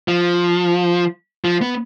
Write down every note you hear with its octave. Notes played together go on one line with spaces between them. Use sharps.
F3
F3
B3